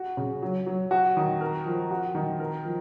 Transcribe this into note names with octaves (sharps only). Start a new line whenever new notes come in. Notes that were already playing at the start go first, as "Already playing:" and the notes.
Already playing: F#4
C#3
F#3
F#3
F#4
D#3
A#4
F3
F#4
D#3
A#4
F3